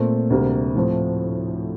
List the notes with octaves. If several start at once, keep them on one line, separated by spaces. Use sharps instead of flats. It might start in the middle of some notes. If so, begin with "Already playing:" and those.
Already playing: A#2 A3 C4
D2 C3 G3 A#3
A2 F3 A3 C4